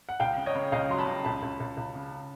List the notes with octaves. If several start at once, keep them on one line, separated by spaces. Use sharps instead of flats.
F#5
C#2 F5 G5
C#3
C#5 D#5
C#3
C#2 D#5 F5
F#3 C6
A5 B5
C#3
C#2 A5 B5
C#2
C#2
C#2
C#3
C#3